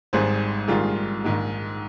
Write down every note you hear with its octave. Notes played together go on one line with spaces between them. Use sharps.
G#1 G#2 G3 G#4 C5
A#1 G#2 D#3 G3 F4 G#4
A#1 G#2 D#3 G#3